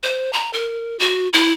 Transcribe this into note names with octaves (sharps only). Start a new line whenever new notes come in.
C5
A#5
A#4
F#4
E4